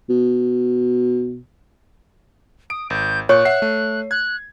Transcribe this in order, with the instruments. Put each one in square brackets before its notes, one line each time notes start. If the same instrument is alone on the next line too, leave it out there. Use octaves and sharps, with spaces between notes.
[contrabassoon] B2
[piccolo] D#6 [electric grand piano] D7
[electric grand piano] G#1 [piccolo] G6
[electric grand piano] A#2 C#6 [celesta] C#5 [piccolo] F#6
[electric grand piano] E5 F#5 C7
A3
[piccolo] F#6 [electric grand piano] G#6